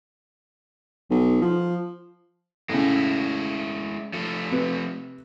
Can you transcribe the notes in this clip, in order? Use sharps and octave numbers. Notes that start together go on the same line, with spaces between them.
B1
F3
A2 C#3 G#3 E4
F3 A3
C3 B4